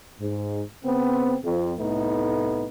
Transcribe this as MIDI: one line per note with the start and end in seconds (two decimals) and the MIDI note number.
0.21 0.61 44
0.85 1.36 49
0.85 1.36 59
0.85 1.36 60
1.44 1.74 41
1.78 2.67 36
1.78 2.67 45
1.78 2.67 57
1.78 2.67 59
1.78 2.67 63